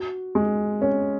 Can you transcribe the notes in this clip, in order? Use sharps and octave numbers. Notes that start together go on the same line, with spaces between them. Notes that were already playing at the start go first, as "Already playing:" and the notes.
Already playing: F#4
G#3
C#4